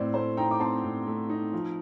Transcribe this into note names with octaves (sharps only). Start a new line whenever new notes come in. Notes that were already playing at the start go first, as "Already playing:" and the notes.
Already playing: A2 C4 C5 D5
A3 C5
D#4 G5 A#5
D6
C4 A5 C6
A2
A3
D#4
F3